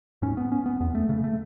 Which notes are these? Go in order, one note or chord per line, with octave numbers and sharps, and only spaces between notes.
G#2 C#4
B3
C#4
B3
E2 B3
A3
C#3 A3
A3